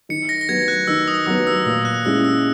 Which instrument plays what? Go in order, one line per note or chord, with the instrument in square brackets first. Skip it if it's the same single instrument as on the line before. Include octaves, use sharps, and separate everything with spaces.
[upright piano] D#3 [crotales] C#7
[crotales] A#6
A#6
[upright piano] F#3 B3 [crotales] G#6
[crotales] F#6
[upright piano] D#3 [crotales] E6
[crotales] D#6
[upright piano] F#3 B3 [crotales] D#6
[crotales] E6
[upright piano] A#2 [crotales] E6
[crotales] F#6
[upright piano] G#3 C#4 E4 [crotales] E6
[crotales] E6